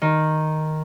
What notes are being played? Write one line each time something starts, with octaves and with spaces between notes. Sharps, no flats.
D#3